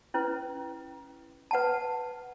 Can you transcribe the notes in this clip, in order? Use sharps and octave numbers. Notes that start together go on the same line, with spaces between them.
C#4 E4 B4
B4 F#5 A5